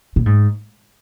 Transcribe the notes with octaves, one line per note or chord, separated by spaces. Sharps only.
A#2
G#2